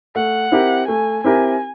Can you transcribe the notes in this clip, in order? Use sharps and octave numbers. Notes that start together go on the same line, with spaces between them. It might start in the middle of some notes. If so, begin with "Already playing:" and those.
A3 F#5
C4 E4 G4 A#4
A3 G#5
C4 E4 G4 A#4 G#5